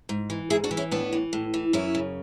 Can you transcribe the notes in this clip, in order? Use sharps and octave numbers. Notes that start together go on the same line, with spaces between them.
G#2
E3
G#2 E4 G#4
D4 F#4
E3
C#4 E4
A2 B3 D4
E3
A2
E3
F#2 C#4 E4
C#3